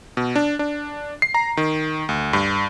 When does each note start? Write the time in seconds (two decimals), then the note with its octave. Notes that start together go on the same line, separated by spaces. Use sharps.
0.17 B2
0.36 D4
0.59 D4
1.22 C7
1.34 A#5
1.57 D#3
2.09 D2
2.33 G2